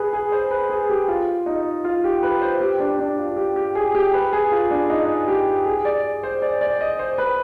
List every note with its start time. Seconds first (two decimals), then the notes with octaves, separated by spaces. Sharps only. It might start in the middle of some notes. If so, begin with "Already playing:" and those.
Already playing: G#4 B4
0.13 G#4
0.32 C5
0.51 B4
0.70 G#4
0.90 G4
1.08 F4
1.46 D#4
1.84 F4
2.04 G4
2.23 B4
2.42 C5
2.60 G4
2.80 D4
2.99 D4
3.18 F4
3.36 G4
3.56 G4
3.75 G#4
3.95 G4
4.13 B4
4.33 G#4
4.52 F4
4.70 D4
4.90 D#4
5.28 G4
5.66 G#4
5.85 D5
6.23 C5
6.42 D5
6.61 D5
6.81 D#5
6.99 C5
7.18 B4